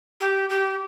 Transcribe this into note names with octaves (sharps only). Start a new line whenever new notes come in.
G4
G4